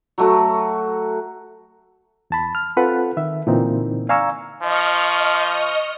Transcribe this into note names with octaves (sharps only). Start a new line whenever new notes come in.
F#3 A3 F#4
E2 A5 B5
F6
C4 F4 A4 B4 F#5
D#3 E5
A#2 D3 E3 A#3 C4 D#4
D5 F5 G#5 A#5 C#6 E6
F3 D#5 C#6 F6